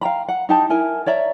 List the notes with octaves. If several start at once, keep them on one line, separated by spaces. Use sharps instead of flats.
F5 G5 A#5 B5
F#5
D#4 G4 A5
E4 A#4 G#5
C#5 D5 E5 A#5